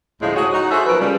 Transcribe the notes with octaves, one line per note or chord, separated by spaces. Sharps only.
D2 A2 C#3 F3 G#3
F#4 G#4 C#5
D#4 F#4
F#4 G#4 A4 C5 E5 F#5
F3 F#3 B3 A#4 B4
C#3 G3